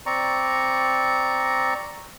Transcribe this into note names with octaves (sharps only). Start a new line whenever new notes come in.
C4 D5 A#5 C#6